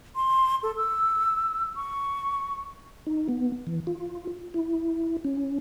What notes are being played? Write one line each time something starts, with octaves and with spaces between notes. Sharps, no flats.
C6
A4
E6
C#6
D#4
B3
E3
F4
E4
C#4